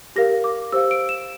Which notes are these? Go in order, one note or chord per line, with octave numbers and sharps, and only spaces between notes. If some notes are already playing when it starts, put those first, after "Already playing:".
G4 A#4 F5 A#6
D6
G4 C5 F5 E6
D7
E7